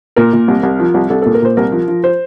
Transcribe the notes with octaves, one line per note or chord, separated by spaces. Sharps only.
A#2 A#4
A#2
C2
C2
F3
C2
C2 A4
A#2 A4
A#4
A#2 C5
C2 A#4
F3
F3
C5